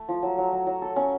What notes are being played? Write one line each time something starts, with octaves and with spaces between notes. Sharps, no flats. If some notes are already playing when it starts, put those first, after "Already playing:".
Already playing: A3
F3
F#3
F#3
F#3
F#3
A4
C#4